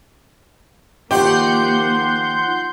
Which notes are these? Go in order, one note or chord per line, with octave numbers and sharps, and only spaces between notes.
D#3 F3 A#3 G4 F#5 C6 G6